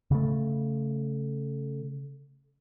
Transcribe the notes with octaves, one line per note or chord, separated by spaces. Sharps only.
C#3 A3